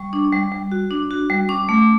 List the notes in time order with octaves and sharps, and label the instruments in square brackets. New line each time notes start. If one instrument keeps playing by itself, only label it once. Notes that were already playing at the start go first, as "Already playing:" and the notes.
Already playing: [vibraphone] G3 C#6
D4
G3
G3
F#4
D4
F#4
G3
C#4 D6
A3